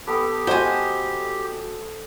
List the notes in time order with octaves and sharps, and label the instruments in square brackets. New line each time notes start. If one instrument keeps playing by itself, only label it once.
[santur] B3 A4 G5 [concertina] G4
[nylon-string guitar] F#4 D#5 [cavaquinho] C5 G#5